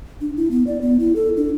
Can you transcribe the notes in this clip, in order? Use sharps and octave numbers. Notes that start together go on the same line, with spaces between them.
D4
E4
B3
D5
B3
E4
A4
D4